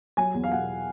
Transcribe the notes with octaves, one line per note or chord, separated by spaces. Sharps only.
F#3 G#5
E2
F5
B2 F#5